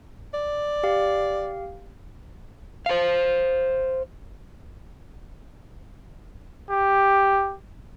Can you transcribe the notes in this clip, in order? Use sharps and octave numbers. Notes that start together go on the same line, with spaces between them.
D5
G4 F5
C5 F5
G4